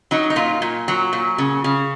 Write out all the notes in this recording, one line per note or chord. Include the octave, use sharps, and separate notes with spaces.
F#3 D#4
D#4
A#2 F4
A#2
F#3
A#2
C#3
C#3